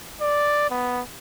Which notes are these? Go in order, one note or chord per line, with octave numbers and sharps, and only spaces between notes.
D5
B3